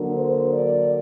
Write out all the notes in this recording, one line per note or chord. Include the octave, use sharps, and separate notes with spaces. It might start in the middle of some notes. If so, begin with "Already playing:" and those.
Already playing: D3 F#3 A#3
C5
D5